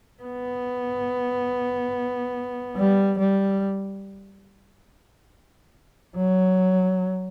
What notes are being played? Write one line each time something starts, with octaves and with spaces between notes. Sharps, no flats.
B3
G3
G3
F#3